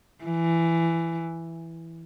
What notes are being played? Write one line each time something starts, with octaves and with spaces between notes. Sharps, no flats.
E3